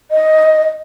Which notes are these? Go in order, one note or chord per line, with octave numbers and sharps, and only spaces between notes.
D#5